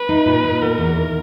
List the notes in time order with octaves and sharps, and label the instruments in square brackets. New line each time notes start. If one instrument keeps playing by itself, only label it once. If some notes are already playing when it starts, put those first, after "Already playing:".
Already playing: [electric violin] B4
[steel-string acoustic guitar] D#4
A#2
A#2
[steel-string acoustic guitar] B3 [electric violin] A#4
[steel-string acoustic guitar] E2
D#3